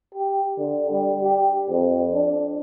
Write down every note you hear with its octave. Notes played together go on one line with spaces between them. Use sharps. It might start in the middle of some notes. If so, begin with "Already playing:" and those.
G4
D3
G3
G4
F2
D4